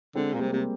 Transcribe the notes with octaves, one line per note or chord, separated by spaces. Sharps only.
D3 G#3 C4
A#2
C3 G3 A#3
C3 A#3